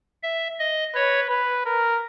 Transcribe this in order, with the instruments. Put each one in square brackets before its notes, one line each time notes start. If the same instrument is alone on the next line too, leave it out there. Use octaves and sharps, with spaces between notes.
[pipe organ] E5
D#5
[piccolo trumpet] B4 [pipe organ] C#5
[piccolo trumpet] B4
A#4